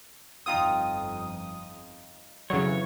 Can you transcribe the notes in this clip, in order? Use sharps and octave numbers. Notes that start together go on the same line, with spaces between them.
G1 F2 D#4 F4 G5 D#6
F2 C#3 E3 F#3 C#5